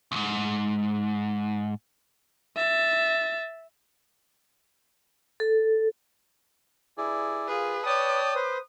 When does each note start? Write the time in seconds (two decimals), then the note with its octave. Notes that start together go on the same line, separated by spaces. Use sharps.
0.12 C#2 G#2
2.56 E5 A6
5.40 A4
6.98 G2 E4 G#4 D5
7.48 G3 A#3 F4 G#4 B4
7.86 C#5 D5 G5 A5 D#6
8.35 B4 C5